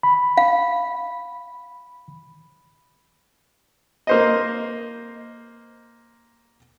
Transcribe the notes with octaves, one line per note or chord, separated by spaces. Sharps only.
B5
F5
A#3 C5 D#5